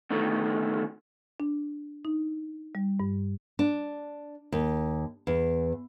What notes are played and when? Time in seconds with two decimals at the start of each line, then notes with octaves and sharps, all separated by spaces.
0.10 B2 D3 D#3 A3
1.40 D4
2.05 D#4
2.75 G3
3.00 G2
3.59 D4
4.52 D#2
5.27 E2